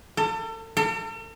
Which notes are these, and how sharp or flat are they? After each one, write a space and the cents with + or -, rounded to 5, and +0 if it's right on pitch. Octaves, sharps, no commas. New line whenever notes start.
A4 +35
A4 +45